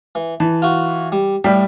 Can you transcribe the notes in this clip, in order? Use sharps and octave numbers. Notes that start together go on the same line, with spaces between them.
E3
E3 A5
F4 F#4
G3
A2 G3 G5